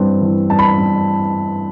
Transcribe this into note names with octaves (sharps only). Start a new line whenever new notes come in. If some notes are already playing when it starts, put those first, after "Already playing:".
Already playing: G2 E3 C4
E3
G2 A5
B5
A5
G2